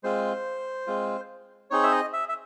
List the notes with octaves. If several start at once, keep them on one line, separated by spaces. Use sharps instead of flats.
G#3 C4 F4 C5
G#3 C4 F4
C4 D#4 G#4 C#5
E5
D#5
E5
E5